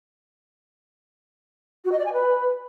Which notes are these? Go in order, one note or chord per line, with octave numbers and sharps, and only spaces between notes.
F#4
D#5
D5
G#5
B4